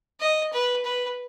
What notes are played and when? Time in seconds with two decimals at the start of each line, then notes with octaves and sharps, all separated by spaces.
0.20 D#5
0.53 B4
0.85 B4